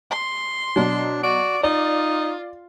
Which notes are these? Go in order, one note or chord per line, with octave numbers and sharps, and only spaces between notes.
C6
B2 F#3 D4
F#4 D5
D#4 F4 D5